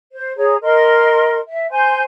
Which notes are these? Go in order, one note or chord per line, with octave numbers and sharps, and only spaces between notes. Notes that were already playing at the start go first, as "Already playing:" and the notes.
C5
G#4 C#5 A#5
A#4 D#5 C6
E5
C5 G#5 C6 G6